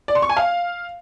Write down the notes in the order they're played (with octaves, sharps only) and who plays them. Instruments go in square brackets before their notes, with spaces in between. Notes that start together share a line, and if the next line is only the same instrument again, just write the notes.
[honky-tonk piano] D5
C6
C#6
G#5
F5